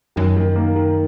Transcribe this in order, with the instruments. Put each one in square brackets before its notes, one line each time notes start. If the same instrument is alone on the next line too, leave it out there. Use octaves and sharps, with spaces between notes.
[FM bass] F#2 [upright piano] D#3
[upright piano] D#3
A#3
D#3